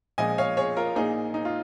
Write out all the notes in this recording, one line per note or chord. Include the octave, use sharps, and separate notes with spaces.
A#1 A#2 F3 G#3 D#5 G#5
C#5 F5
G#4 C#5
F4 A#4
A#1 A#2 A#3 D#4 G#4
D#4
F4